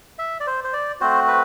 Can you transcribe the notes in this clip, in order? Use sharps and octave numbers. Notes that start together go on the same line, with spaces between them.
E5
D5
C5
C5
D5
A3 C4 F#4 C5
B4